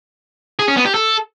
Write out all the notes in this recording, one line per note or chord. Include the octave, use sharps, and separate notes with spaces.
G#4
C#4
B3
G4
A4